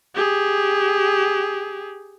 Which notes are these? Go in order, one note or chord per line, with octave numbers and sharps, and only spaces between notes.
G4 G#4